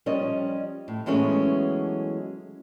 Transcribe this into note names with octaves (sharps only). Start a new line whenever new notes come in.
F3 G3 C#4 C#5 D#5
A2
E3 F#3 G#3 A3 B3 C#4